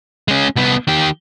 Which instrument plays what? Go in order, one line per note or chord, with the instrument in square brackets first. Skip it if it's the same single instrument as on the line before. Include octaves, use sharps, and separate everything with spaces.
[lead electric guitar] G#3 C#4
C2 B3
D#3 G4